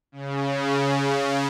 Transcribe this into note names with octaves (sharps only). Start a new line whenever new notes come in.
C#3